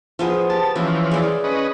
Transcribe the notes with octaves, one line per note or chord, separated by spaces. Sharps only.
F3 B3 G#4
G4 A5
E3 F3 C#4
G#4 D5
C#4 B4 D#5